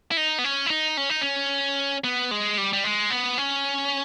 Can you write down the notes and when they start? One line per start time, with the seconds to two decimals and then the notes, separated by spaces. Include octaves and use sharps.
0.11 E4
0.17 D#4
0.39 B3
0.44 C#4
0.66 E4
0.70 D#4
0.97 C#4
1.10 D#4
1.21 C#4
2.04 B3
2.31 G#3
2.58 G3
2.73 G3
2.84 G#3
3.10 B3
3.38 C#4